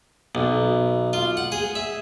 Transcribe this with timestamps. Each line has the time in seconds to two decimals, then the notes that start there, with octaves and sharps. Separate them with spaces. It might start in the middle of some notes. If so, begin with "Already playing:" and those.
0.35 B1
1.13 F4
1.37 F#5
1.52 G#4
1.75 E5